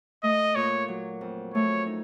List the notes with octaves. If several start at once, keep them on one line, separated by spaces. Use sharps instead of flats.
A3 D#5
A#2 C#5
F#3
F2
A3 C#5
D#4